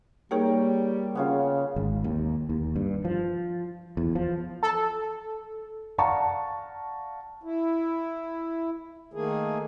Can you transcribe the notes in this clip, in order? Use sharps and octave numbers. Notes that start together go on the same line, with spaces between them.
G3 A#3 D#4 G#4 A#4 C#5 G5
C#3 B3 C#4 F4
G#1
D#2
D#2
G2
F3
E2
F3
A4
D5 F5 F#5 A5 A#5 C#6
E4
D#3 A3 A#3 G#4